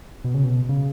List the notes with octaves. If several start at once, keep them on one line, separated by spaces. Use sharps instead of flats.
B2
C#3
B2
C#3